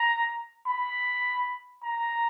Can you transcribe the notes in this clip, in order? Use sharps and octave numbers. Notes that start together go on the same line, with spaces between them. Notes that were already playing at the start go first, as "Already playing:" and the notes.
Already playing: A#5
B5
A#5